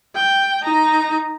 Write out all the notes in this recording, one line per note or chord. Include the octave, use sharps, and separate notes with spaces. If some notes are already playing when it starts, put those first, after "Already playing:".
G5
D#4 A#5